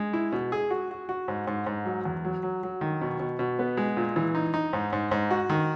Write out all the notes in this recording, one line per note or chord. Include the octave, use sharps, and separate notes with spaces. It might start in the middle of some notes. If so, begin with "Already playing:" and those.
Already playing: G#3
E4
B2
G#4
F#4
F#4
F#4
G#2
G#2
G#2
F#3
E2
F#3
F#3
F#3
D#3
B2
B2
B2
B3
G#3
A#2
E3
D#4
D#4
G#2
G#2
G#2
F#4
D#3